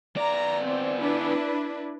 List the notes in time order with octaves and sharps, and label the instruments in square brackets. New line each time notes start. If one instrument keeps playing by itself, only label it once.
[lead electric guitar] B3 D5 [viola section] A#5
[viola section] C4
D4 E4 B4